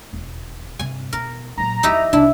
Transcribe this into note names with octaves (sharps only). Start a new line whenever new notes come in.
E1 D#2
G2 C3 G#5
E2 B2 A#4
A#2 F#3 A#5
E2 F3 D#4 E4 G4
C2 D4 E4